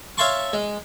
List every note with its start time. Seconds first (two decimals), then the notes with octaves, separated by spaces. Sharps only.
0.18 C#5 E5 F5 A5 C6 C#6
0.53 G#3